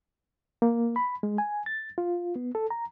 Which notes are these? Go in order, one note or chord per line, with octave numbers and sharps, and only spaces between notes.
A#3
B5
G#3
G#5
A6
F4
B3
A4
A#5